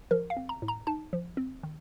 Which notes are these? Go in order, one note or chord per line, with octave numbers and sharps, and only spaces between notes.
F3 A#4
F5
C4
A#5
A2
A#5
D#4 A5
F3
C4
D#3